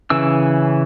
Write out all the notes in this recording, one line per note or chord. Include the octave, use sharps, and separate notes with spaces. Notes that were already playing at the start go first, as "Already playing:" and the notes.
C#3 E3 E6